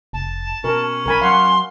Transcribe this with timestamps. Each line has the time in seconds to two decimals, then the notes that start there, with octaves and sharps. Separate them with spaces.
0.13 F1 A5
0.64 B2 C#4 A#4
1.06 C2 A#4 G#5 B5
1.22 F#3 F5 F#5 C6